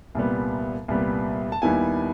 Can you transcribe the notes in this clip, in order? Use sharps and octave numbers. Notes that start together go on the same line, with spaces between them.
C2 A#2 G3 B3
C2 A#2 G3 B3
A5
D#2 D#3 G3 B3 E4 G#5